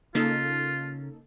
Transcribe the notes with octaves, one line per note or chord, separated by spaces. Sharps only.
C#3 A#3 D#4 F4 A4